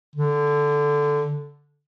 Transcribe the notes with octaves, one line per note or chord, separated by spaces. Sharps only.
D3